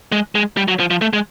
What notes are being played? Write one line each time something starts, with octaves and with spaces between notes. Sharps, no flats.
G#3
G#3
G3
F#3
F3
F3
A3
G#3